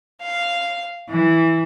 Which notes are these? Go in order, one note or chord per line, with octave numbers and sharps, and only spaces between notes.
F5
E3